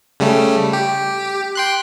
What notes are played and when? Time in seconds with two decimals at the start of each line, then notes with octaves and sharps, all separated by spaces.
0.20 C#3 G3 A3
0.73 G4
1.55 G5 C6 F#6